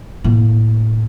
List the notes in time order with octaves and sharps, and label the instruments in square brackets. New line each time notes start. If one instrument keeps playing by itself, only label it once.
[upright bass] A2 A#3